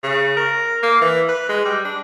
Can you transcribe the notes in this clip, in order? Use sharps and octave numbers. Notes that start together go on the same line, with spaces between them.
C#3
A#4
A#3
E3
B4
G#3
G3
D4